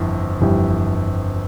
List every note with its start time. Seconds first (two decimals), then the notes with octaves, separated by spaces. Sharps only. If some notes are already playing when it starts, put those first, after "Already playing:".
Already playing: G1 F2 E3
0.41 G1 F2 E3 G3